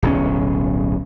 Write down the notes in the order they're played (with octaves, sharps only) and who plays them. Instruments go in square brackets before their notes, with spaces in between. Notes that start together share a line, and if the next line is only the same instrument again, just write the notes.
[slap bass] D1 B1 C#4